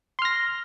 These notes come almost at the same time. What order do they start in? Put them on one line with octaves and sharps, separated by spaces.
C6 F6 A#6